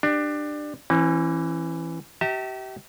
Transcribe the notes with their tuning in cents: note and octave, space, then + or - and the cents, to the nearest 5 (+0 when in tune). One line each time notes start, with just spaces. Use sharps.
D4 +20 G4 +10
E3 +10 C#4 -45
G4 -35 E5 -30 A5 +40